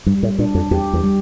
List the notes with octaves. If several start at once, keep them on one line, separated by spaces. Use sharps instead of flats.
G2 G3
A2
A#2 D4
F2
E2 G4
E2
G3